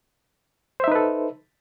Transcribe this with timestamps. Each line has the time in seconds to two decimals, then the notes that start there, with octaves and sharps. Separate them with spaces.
0.80 C5
0.84 E5
0.88 D#4
0.92 B4
0.95 A4